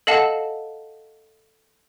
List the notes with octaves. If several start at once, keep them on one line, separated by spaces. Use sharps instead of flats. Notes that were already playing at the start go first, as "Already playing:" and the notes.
A4 D#5 F5 F#5 A5